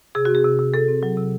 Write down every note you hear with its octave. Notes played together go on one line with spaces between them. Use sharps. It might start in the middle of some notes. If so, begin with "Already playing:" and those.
C3 G#4
F#4
C4
G#4
C3
C3
C3 A4
C4
F#3
C3